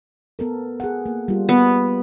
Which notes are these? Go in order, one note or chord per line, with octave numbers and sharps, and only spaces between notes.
B3 A4 A#4
G#4 F#5
A#3
G3 F4
B3